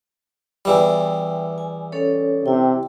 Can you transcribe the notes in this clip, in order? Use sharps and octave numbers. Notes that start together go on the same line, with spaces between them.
E2 E3 G3 G5
G#5
C#4 A4 C#5
C3 E4 G5